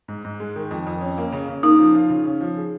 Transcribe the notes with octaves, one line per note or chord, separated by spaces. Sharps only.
G#2
G#2
G#3
D#3
F2
F2
C#4
A#3
C#3
C#3
A#3 D#4
F3
F4
C#3
C#4
F3
G#4